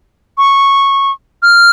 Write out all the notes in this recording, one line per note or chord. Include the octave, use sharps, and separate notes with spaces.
C#6
F6